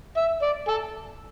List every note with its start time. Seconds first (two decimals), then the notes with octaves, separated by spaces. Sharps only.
0.17 E5
0.42 D5
0.68 A4